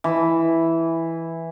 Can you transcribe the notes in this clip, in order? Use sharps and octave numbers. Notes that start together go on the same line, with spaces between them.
E3